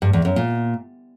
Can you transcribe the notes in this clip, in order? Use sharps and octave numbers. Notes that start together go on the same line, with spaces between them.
G2
E2
F#2
A#2